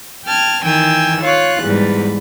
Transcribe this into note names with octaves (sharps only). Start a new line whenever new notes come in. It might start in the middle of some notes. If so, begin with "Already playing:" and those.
G5 A5 F6 G#6
D#3 E3 G5 G#5 E6
F4 C#5 F5 F#6
E2 G#2 G3 B4